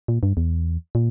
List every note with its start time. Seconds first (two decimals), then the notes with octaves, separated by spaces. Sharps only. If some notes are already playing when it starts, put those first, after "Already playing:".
0.08 A#2
0.23 G2
0.37 E2
0.95 A#2